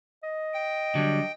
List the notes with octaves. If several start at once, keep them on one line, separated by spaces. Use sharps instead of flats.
D#5
G5
D3 F#3 G3